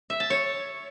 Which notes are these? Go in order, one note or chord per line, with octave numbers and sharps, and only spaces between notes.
E5
A5
C#5